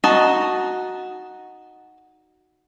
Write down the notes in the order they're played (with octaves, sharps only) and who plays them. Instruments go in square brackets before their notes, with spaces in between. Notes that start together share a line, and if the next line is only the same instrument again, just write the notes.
[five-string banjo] D#4 F#4 D#5 A5